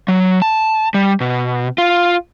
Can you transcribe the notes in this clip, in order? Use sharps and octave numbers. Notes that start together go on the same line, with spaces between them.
F#3
A5
G3
B2
F4